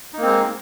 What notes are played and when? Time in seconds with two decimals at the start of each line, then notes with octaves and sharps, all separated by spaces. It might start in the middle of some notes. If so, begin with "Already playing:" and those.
0.13 D#4
0.18 A#3
0.22 C4
0.26 G#3